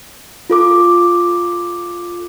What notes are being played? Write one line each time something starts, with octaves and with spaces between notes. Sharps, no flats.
F4 A4 D6